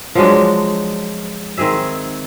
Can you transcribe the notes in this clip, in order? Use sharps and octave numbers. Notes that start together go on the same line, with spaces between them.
F3 F#3 G#3 D4
D#3 C4 G#4 E5